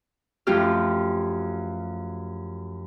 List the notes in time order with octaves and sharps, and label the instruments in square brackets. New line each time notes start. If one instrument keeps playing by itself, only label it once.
[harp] F#2 F3 A3 F4 G4 F6